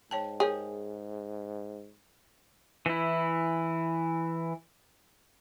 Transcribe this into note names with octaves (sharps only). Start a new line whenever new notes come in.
G#2 C#5 G5 A5
G#4 A#4 C#5 G5
E3 E4